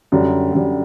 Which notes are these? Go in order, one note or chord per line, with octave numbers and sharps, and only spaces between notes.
F#2 D3 G3
F#2 D3 G3